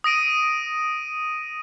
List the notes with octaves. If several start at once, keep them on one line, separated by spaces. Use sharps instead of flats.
D#6 A#6 D7 D#7